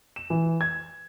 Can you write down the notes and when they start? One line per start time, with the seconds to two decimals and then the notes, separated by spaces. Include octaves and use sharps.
0.16 E7
0.30 E3
0.61 G#6